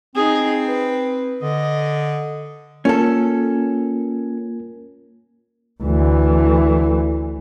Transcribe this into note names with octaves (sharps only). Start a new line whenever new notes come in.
C4 D#4 G#4
B4
D3 D#5
A#3 C#4 F4 A4 A#4
D2 E3